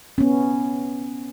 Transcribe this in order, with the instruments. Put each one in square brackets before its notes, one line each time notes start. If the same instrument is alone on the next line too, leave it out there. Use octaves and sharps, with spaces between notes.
[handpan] B3 C#4